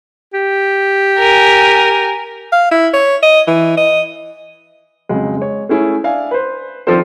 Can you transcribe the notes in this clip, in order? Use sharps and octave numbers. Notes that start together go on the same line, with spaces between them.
G4
A#4 G#5
F5
E4
C#5
D#5
E3
D#5
F2 C#3 F#3 G#3
G#3 C#5
A3 C#4 E4 G#4
D4 E5 F5 G#5
B4 C5
D#3 F3 C4 D4 A4 C5